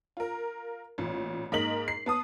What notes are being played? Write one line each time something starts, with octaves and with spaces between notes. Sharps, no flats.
F4 A#4
A1 A#2
G#2 A#3 A#4 D#5 B6 F#7
C7
B3 A5 D#6